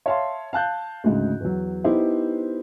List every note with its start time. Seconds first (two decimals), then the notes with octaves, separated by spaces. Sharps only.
0.06 C#5 E5 F5 A5 C6
0.53 F5 A5 F#6 G6
1.04 D2 G#2 C#3
1.40 E2 F#3
1.84 B3 D#4 E4 G4 C5